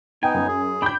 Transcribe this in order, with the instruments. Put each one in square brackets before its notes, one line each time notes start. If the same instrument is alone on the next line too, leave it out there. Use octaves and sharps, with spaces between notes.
[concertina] B3 D#4 [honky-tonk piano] G5 [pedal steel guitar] G#5
[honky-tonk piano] F#2
[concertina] G#4
[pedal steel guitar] D4 G5 [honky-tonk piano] B5 G6